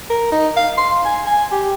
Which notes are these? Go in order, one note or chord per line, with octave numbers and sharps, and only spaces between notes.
A#4
D#4
F5
C6
G#5
G#5
G4